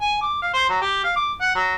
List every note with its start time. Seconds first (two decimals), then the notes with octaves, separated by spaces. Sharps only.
0.01 G#5
0.22 D6
0.42 F5
0.54 C5
0.69 F#3
0.81 G4
1.04 F5
1.16 D6
1.41 F#5
1.55 F#3